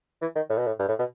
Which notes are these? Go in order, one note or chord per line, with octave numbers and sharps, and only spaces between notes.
E3
D#3
A2
B2
A2
G2
A2
B2